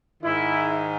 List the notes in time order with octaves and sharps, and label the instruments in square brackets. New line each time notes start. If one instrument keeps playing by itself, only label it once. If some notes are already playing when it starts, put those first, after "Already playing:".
[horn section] G#2 D#3 E4